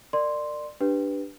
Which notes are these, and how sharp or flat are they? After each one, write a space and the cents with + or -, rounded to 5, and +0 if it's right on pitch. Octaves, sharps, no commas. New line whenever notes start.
A#4 -20 D5 +20 C6 +0
D4 +0 G4 +0 B4 +0